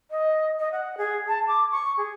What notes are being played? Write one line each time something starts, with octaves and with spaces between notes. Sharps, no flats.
D#5
D#5
F#5
G#4
A5
D6
C#6
G#4